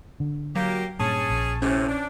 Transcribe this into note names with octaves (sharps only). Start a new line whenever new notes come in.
D3
F#3 A#3 G4
G2 A#2 C#4 G#4 A5
A#1
A2 C3 C#4
D4